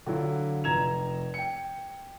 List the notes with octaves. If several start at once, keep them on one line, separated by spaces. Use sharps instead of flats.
D3 F#3 E4 F4
F1 A#5 G#6 E7 F7
G5 C#7